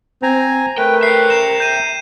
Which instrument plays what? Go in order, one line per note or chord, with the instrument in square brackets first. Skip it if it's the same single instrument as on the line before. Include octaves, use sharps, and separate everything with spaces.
[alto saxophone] C4 [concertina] G#5 A#5
[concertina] A3 B4 [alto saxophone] A#4 [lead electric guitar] G5
[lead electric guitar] E5 G5 [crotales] C7
[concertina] A#5 [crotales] E7
[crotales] G6 D#7